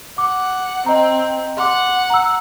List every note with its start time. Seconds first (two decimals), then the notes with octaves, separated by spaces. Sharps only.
0.18 F#5 D6
0.86 C4 D#5 A#5
1.58 F#5 C6 D6
2.10 A#5 E6